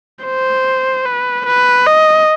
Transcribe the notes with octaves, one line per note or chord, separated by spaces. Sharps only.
C5
B4
B4
D#5